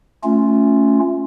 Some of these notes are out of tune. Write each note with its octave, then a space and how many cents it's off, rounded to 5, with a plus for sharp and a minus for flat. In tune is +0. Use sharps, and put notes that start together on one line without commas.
A3 +0 C#4 +0 F4 +0